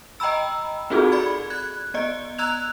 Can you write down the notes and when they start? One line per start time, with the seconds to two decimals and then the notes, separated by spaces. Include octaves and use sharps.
0.20 D#5 G5 A#5 B5 E6
0.90 C4 D#4 F4 F#4 G#4 A4
1.12 D5 B5 G#6
1.50 F#6 G#6
1.94 B3 D5 D#5
2.38 A#5 E6 F#6 G#6 F7